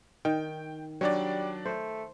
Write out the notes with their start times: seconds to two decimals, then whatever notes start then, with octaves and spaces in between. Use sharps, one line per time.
0.25 D#3 G5
1.01 F#3 G3 D4 C#5 D5
1.65 A3 C5